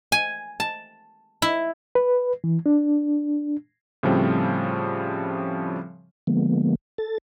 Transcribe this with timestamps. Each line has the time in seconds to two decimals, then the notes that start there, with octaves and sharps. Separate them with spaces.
0.12 G#5
0.60 A5
1.42 E4
1.95 B4
2.44 E3
2.66 D4
4.03 A2 C#3 F3 G3 C4
6.27 D3 F3 G#3 A#3 B3
6.98 A4 A6